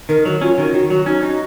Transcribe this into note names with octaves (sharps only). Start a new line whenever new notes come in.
D#3 A#4
F#3 F#4
C#4 F4
D#3 F#4
D#3 F#4
F#3 F#4
C#4 D#4
D#4 F#4